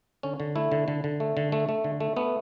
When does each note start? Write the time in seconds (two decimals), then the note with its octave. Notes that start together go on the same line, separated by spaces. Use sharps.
0.23 D3 C#4
0.40 D3
0.56 A3 E4
0.72 D3
0.88 D3
1.04 D3
1.20 A3
1.37 D3
1.52 A3
1.69 A3
1.84 D3
2.00 A3
2.17 A3 B3